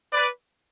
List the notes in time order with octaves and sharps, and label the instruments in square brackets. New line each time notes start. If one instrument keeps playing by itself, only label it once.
[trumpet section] B4 D5